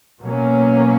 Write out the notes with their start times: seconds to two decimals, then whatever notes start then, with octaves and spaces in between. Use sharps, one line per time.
0.21 B2 F#3 A#3 C#4